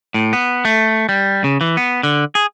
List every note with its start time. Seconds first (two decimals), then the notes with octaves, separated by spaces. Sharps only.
0.14 A2
0.33 B3
0.65 A3
1.09 G3
1.44 C#3
1.61 E3
1.77 B3
2.03 D3
2.35 G#4